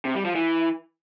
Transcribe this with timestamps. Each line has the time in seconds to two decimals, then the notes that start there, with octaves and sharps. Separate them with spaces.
0.05 C3
0.15 G3
0.25 F3
0.35 E3